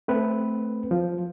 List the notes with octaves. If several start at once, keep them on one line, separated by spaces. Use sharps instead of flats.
A3 C4 B4
F3